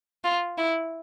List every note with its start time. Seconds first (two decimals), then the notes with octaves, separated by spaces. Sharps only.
0.24 F4
0.57 E4